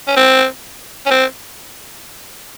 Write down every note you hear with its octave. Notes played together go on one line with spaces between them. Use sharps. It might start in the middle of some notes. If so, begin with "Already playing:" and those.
C#4
C4
C#4
C4